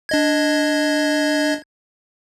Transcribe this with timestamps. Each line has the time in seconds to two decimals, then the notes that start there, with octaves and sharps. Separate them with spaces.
0.09 D4 D#5 G#6